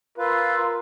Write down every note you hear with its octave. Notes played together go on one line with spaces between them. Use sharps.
F4 A#4 B4 F5 C6 E6